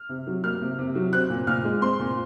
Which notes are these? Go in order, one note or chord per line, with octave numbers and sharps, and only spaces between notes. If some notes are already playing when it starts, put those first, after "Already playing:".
Already playing: F6
C3
F#3
A#3 F6
C3
C3
F#3
C4 F#6
A#2
A#2 F6
G#3
C4 C6
A#2